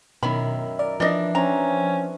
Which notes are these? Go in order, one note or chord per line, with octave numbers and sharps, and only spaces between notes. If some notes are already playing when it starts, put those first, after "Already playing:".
F#2 B2 D#3 E4 B5
A#4 D5
E3 F3 D4 D5 D#5
C4 C#4 A#5